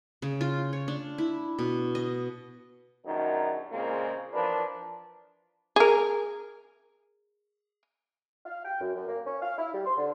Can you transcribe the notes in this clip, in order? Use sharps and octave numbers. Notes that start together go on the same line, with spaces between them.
C#3
F4
C#5
D4
E4
B2
D#5
A#1 F#2 D#3 D4 D#4
A#2 C#3 G#3 A#3 C4 F4
E3 F3 D4 A#4 B4
G#4 A#4
F5
G5
F#2
F#2
A#3
C#4
F5
E4
G3
C6
D3